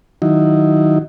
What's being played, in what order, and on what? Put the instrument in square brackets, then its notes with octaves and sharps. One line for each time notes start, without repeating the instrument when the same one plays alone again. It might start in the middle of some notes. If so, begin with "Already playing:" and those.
[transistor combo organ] D#3 F#3 D#4 E4